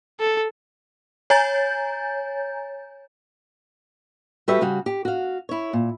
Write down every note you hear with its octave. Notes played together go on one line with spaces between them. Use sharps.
A4
C#5 G#5 A#5 G6 A6
G3 F#4 G4 A4 B4 E5
C#3 G3 F#4
G4
F#4 F5
E4 C#5
A#2